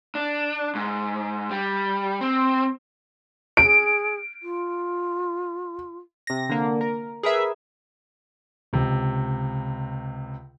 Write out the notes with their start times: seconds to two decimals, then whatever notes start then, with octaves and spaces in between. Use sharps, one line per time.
0.15 D4
0.75 G#2
1.51 G3
2.21 C4
3.57 G#4 D7
4.43 F4
6.27 C3 A#6
6.49 D3 A#3
6.81 A#4
7.23 G#4 A#4 B4 E5
8.73 C#2 C3